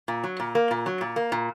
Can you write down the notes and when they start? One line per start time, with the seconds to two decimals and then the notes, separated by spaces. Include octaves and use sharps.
0.08 A#2
0.24 F#3
0.40 A#2
0.55 A#3
0.71 A#2
0.86 F#3
1.01 A#2
1.16 A#3
1.32 A#2